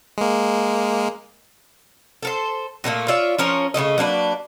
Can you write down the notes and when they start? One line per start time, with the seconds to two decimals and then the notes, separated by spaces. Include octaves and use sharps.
0.18 G#3 A#3
2.23 A4 A#4 C5
2.84 A#2 D3 A3 A#3
3.08 F4 C#5 D5 E5
3.38 F3 C#4 A#4 C#5
3.74 C#3 F3 A3 D#5
3.98 F#3 A#3 D4 B4